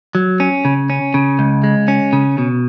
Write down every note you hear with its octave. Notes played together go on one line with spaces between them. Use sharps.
F#3
C#4
C#3
C#4
C#3
C#2
G#3
C#4
C#3
B2